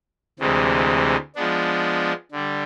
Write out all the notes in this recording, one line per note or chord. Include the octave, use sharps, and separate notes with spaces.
D2 C3 E3 G#3
F3 G#3 B3 D4
D3 G3